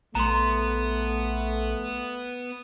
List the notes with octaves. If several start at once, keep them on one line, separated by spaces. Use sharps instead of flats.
A#1 A3 B3 A#5 C6